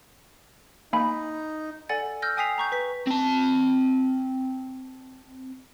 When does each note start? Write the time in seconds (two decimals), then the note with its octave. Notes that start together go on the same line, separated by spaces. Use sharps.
0.93 A#3 D#4 G#5 B5
1.89 A4 D5 F#5 G#5 A6
2.22 E6 F6 G6 A#6
2.37 G5 G#5 D#6 B6 C7 F7
2.58 A#5 C#6 G6
2.72 B4 B6
3.07 C4 A5